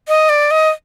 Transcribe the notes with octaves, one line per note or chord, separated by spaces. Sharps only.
D#5
D5
D#5